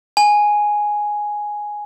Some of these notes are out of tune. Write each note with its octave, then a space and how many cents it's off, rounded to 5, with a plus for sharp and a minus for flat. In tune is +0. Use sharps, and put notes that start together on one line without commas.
G#5 +0